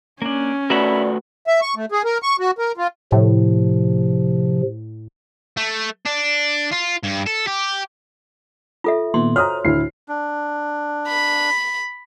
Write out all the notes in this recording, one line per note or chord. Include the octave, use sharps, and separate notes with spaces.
A#3 C#4 D4
A3 F#4 A#4 B4 D5 E5 B5
E5
C#6
A3
G#4
A#4
C#6
F#4
A#4
F4
A2 C3 F3
A3
D4
F4
G2
A4
G4
F4 A4 E5
A#2 D#3 B3 C6
F#4 C5 C#5 A#5 D#6 F6
D2 A2 E4 C7
D4
B5